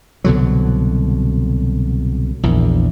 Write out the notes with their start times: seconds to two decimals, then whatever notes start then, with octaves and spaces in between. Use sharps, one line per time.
0.24 C2 B2 D3 F#3
2.43 A#1 E2